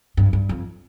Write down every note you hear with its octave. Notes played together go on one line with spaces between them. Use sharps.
G2
G2
F2